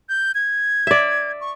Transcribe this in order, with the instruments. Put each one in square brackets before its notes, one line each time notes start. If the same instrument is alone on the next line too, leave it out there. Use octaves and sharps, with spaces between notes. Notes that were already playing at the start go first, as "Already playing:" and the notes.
[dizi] G6
G#6
[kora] D5 E5
[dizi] C#6